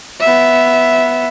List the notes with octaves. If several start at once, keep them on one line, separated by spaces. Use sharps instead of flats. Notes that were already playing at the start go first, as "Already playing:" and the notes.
B3 E5